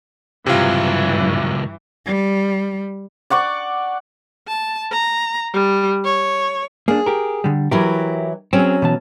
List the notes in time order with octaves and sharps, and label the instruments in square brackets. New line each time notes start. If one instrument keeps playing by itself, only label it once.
[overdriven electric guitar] C#2 F#3 [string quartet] G2 E3 [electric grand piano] C3 F4
[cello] G3
[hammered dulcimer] D5 F#5 C#6 D6
[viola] A5
A#5
G3
C#5
[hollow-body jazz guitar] A#3 D4 [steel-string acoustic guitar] G#4
[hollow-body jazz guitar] G4 A#4
D3 G3
[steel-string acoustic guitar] E3 F#3 E4 [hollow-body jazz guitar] G4 A#4
[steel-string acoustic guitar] F#3 C#4 [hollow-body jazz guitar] C4 G#4
[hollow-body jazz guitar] B2 E3 A5